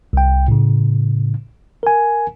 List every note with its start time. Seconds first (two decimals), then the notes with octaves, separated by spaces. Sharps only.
0.13 C2 G5
0.48 A2 C#3
1.83 A#4 G#5